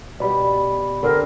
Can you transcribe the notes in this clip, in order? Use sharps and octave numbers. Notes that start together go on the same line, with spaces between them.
B2 G3 D5 B5
D3 C4 A#4